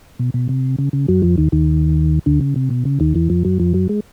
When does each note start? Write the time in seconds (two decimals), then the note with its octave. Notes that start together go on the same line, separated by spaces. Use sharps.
0.19 B2
0.34 B2
0.49 C3
0.79 C#3
0.93 C#3
1.08 F#2 F#3
1.22 F2 F3
1.37 D#2 D#3
1.52 D#2 D#3
2.26 D2 D3
2.41 C#3
2.56 C3
2.70 B2
2.85 C#3
3.00 D#2 D#3
3.15 E2 E3
3.30 F2 F3
3.45 F#2 F#3
3.59 F2 F3
3.74 F#2 F#3
3.89 G#3